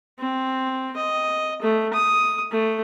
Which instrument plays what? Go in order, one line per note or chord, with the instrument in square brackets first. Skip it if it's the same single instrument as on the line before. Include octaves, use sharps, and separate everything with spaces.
[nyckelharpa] C4
D#5
A3
D#6
A3